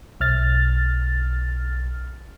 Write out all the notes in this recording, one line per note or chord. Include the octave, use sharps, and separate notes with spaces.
B1 F6 A6